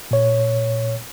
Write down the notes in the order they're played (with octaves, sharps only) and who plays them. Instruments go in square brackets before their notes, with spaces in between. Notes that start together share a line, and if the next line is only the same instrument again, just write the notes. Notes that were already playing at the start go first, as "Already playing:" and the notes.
[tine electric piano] A#2 C#5